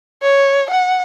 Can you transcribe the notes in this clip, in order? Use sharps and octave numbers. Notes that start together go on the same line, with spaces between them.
C#5
F#5